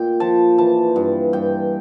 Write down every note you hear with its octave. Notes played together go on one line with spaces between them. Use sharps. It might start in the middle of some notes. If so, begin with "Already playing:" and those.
Already playing: A#2 G5
F3 A5
E3 A5
G2
G2 G5